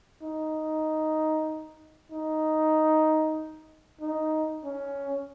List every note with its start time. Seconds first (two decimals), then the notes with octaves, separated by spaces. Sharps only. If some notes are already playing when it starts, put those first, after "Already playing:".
0.22 D#4
2.12 D#4
4.01 D#4
4.64 C#4